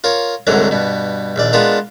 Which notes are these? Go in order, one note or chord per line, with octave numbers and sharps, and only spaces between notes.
F4 A#4 C#5
C2 G#2 D3 F#3 A#4
G2 B2
A#1 D#2 D5
G#3 B3 D4 F4 A#4